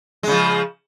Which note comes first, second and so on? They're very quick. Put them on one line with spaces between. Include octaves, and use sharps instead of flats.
G#3 C#3 F3